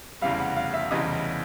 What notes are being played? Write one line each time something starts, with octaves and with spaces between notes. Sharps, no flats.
F1 E2 C#3 E3 G3 F5
F#5
F5
E5
F1 E2 C#3 E3 G3 D#5